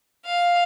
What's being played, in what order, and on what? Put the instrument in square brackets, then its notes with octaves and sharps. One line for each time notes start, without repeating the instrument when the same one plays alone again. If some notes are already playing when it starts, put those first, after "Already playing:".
[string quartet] F5